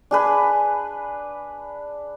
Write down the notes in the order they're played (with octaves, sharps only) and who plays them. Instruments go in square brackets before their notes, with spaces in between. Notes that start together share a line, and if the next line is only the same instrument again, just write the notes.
[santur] D4 G#4 B4